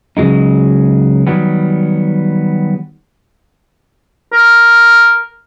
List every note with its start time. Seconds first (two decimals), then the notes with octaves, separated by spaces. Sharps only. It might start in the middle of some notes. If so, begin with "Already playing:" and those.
0.17 C#3 F#3 G#3 D#4
1.27 D#3 F#3 G3 B3
4.33 A#4